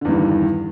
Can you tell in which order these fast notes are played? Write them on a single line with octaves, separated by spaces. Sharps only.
D3 E2 G2 D#3